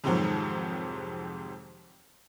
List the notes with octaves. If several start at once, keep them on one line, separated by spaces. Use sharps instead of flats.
F2 G#2 C3 D#3 F3 F#3